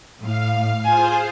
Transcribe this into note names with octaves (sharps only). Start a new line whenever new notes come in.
A2 F5
F4 G#4 C5 G#5